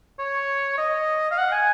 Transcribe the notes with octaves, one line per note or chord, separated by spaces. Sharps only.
C#5
D#5
F5
F#5
G#5